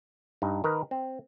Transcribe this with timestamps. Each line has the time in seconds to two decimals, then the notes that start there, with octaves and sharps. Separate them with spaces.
0.42 G2 D#4
0.64 D#3 A#4 B4
0.91 C4